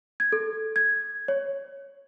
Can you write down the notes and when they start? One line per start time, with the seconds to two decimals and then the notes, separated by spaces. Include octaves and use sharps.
0.20 G#6
0.32 A4
0.76 G#6
1.28 C#5